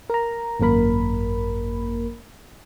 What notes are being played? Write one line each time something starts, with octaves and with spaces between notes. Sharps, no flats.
A#4 A#5
G#1 F#2 A#3 A#4 B5